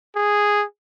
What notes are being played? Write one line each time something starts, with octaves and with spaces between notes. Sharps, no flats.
G#4